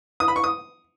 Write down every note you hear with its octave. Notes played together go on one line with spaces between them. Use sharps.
D#6
B5
C#6
D#6